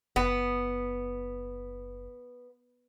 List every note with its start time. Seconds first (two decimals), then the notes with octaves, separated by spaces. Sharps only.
0.16 F#1 B3